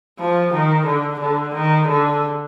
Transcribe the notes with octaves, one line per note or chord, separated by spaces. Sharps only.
F3
D#3
D3
D3
D#3
D3